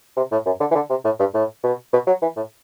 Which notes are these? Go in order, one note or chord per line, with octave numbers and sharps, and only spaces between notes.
C3
A2
F#2
D3
E3
D3
C3
A2
G2
A2
B2
B2
F#3
E3
A2